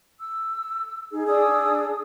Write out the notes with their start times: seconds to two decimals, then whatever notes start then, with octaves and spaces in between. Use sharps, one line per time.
0.20 E6
1.12 D#4 G#4
1.27 D4 G#4 D#6 E6